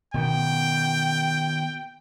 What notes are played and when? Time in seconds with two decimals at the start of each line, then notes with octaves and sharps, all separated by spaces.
0.14 B2 D#3 B3 G5